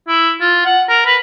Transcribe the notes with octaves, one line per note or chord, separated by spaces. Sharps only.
E4
F4
F#5
A#4
B4